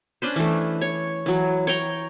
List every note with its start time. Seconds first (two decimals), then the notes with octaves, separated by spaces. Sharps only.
0.22 C#4 D4 B4 C5
0.36 E3 A3
0.81 C#5
1.26 E3 F#3
1.67 C#5 G5 A#5